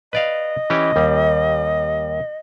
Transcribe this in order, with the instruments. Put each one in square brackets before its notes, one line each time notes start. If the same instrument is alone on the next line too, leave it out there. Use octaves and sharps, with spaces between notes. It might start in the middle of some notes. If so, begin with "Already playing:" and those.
[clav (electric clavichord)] B4 D5 F5 [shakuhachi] D#5
[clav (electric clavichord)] E3 C#4 G4
D#2 G3